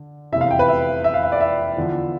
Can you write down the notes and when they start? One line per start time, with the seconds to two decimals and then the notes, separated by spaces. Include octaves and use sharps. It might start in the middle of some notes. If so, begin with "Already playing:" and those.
Already playing: D3
0.32 F1 E2 C3 E5
0.41 F5
0.51 G5
0.59 B4
0.68 E5
1.04 E5
1.14 F5
1.23 E5
1.32 D5
1.41 E5
1.77 E2 D3 F3